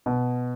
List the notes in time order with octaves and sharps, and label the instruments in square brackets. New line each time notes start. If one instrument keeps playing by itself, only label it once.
[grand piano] B2